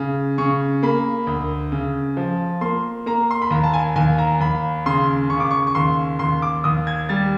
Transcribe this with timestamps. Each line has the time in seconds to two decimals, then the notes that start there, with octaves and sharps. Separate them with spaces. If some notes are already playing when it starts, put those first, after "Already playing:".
Already playing: C#3
0.38 C#3 C#6
0.83 A#3 B5
1.27 D2
1.72 C#3
2.17 F3
2.61 A#3 C6
3.06 A#3 A#5
3.31 C6
3.42 B5
3.51 D#2 A#5
3.63 A5
3.73 G#5
3.96 D#2 G#5
4.18 A#5
4.41 D#2 B5
4.86 C#3 C6
5.30 C#3 C#6
5.40 D6
5.51 C#6
5.67 C#6
5.75 D#2 C6
6.19 D#2 C6
6.42 D6
6.64 D#2 D#6
6.87 G#6
7.09 G3 A6